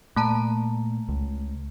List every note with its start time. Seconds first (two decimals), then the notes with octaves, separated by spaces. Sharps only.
0.16 A#2 A3 A5 A#5
1.08 C#2